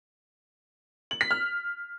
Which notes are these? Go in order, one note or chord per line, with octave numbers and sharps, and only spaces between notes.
F#7
B6
F6